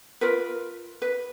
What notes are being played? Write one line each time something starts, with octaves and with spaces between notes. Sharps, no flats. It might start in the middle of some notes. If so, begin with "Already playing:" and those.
F4 A#4 B4
B4